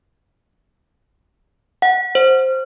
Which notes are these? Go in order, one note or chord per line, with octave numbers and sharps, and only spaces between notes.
F#5
C5